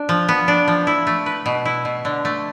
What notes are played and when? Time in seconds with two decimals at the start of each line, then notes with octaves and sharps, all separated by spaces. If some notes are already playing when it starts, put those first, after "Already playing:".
Already playing: D4
0.09 F3
0.28 B3
0.48 D4
0.68 F3
0.87 E4
1.07 A3
1.26 B4
1.46 B2
1.65 E4
1.85 B2
2.05 D3
2.25 A3